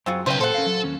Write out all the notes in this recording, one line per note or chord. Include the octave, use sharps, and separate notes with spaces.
F#2 F#3 C4 F4 F#4 G#4
B1 C#3 B4 C5 G5
A#2 G#4 A4 C5 F#5
C#4 A#4 F5
F#3
D#2 C#4